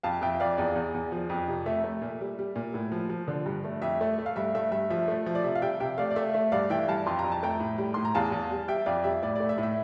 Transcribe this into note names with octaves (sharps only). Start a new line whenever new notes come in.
F2 F5 A5
F2 E5 G5
F2 D5 F5
E2 D5
E2
E2
F3
F2
C3
A3 E5
A3
A#2
G3
G3
A#2
A2
F3
F3
D3
G2
A3
F2 E5
A3
A3
F5
G2 E5
A3 E5
G2 E5
F3 E5
A3
F3
D5
C3 E5
F5
G3 E5 G5
C3 E5 G5
A3 D5 F5
D5
A3 E5
A3 E5
G2 D5 F5
E3 E5 G5
G2 F5 A5
F2 C6
A#5
F2
A5
A3 G5 A#5
A2
G3
A2 C6
A#5
E2 F5 A5
E2
G3
G3 E5 G5
F2 D5 F5
G3 E5
A2 D5
A3 D5
E5
A2
E5